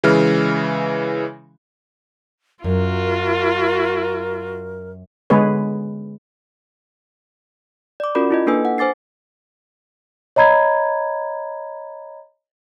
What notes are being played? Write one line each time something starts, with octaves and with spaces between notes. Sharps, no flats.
C#3 E3 G#3 F6
F#2 F4 F#4 A#4
D3 G#3 B3 G#4 B4 C#5
D5 D6
C#4 F4 F#4 A#4 D5 B5
E4 F4 D#5
A#3 D4 A4 B4 G#5 E6
F#5
C5 G#5 D6 A6 C7
C#5 D#5 A#5 B5 G#6